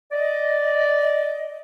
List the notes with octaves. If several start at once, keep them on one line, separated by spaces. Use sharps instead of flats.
D5 D#5